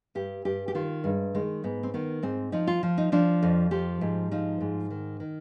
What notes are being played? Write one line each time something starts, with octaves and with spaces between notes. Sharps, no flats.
G2 G4
G2 G4
G4
D#3 F4
G2 G#3
D#3 G#3
G#2 B3
C4
D#3 B3
G#2 C4
F3 D#4
F4
F3
D#4
F3 D4
F2
F3 G4
G#2
F3 D#4
G#2
D#3
D#3